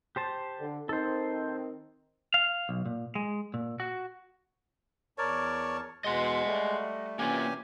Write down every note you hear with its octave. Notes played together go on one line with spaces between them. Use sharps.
G4 C5 A5
D3
D#3 C4 D#4 A4 C5
F5
B1
A#2
G#3
A#2
F#4
E2 A#4 C#5 D5 A5 C#6
E2 B2 G#3 D#5 F#5 C6
G3 A3
C3 E3 A#3 C#4 F4 G4 G#5